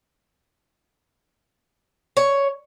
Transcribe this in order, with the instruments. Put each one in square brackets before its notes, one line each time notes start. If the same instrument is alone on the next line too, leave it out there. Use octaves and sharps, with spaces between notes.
[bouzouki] C#5